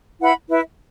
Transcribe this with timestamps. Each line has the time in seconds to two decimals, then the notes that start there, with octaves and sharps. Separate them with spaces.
0.19 E4 B4 F#5 B5
0.49 E4 B4 E5